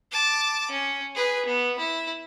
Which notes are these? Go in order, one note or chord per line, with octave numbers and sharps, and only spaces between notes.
A5 D6
C#4
G#4 B4
B3
E4